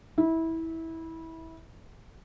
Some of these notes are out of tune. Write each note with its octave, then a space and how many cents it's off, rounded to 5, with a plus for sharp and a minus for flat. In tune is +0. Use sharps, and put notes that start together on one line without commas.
E4 -20